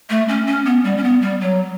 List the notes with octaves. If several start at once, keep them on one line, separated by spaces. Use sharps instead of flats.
A3
C#4
C#4
B3
G3
C#4
B3
G3
F#3